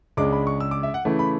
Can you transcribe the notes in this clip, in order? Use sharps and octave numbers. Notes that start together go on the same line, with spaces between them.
C#2 C#3 G#3 D4 D6
B5
C#6
E6
D6
E5
F#5
C#3 E3 A3 E4
B5